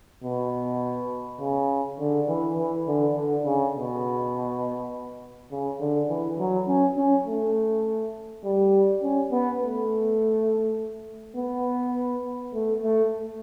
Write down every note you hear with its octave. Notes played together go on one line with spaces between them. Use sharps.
B2
C#3
D3
E3
E3
D3
D3
C#3
B2
C#3
D3
E3
F#3
C#4
C#4
A3
G3
C#4
B3
A3
B3
A3
A3